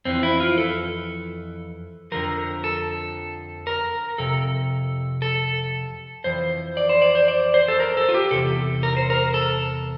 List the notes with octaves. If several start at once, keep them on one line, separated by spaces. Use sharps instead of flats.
F2 E3 C4
E4
F4
A4
F2 D3 F3 A#4
A4
A#4
F2 C3 A4
A4
F2 E3 C5
D5
C5
D5
C5
D5
C5
A4
A#4
A4
F4
G4
E2 C3 A4
A#4
C5
A#4
A4